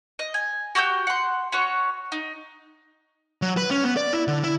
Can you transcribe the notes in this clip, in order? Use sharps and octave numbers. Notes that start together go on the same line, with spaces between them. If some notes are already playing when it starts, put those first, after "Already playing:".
D#5
G#5
F#4 G4 D#6 G6
F#5 C6
C#4 F#4 C#5
D#4
F#3
B4
C#4
B3
D5
E4
D3
E4